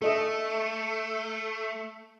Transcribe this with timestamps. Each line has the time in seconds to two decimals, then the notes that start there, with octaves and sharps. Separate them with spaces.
0.02 A3 A4 D#5 E5